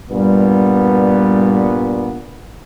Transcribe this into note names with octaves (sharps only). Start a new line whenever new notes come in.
G2 A#2 G3 B3